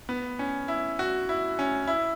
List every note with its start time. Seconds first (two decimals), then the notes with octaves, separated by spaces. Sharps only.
0.09 B3
0.39 C#4
0.68 E4
0.99 F#4
1.29 E4
1.59 C#4
1.87 E4